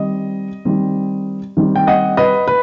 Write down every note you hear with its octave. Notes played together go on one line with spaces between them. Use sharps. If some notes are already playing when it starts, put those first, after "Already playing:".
Already playing: D#3 G3 C4 D#5
D#3 G3 C4
D#3 G3 C4
G5
D#5 F#5
B4 D#5
B4